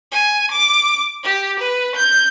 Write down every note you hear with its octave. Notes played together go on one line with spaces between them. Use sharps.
G#5
D6
G4
B4
G6